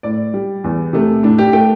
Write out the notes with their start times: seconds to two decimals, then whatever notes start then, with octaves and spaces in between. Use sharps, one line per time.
0.03 A2 D5
0.34 G3
0.64 E2
0.93 C3 A3
1.23 A2 D4
1.38 G4
1.53 A3 G5